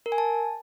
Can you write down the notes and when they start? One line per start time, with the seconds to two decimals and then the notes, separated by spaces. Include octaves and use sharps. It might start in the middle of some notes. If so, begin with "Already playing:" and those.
0.06 A#4
0.12 G#5
0.18 A5